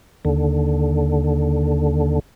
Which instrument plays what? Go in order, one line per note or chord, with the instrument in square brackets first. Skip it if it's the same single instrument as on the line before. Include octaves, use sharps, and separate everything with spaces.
[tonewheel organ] D#2 D3